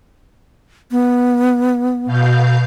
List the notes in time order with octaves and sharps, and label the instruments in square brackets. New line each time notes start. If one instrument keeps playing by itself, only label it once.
[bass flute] B3
[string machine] B2 F5 G6